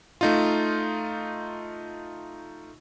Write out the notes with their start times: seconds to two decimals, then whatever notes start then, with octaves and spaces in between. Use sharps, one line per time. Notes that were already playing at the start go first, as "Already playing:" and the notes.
0.21 A3 D#4 F4